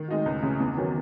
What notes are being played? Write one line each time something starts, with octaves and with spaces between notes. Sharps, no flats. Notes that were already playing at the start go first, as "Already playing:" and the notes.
Already playing: D#3
G#3 D#4 F#4
C#2
C#3 E3
E2
D#3 F#3 C#4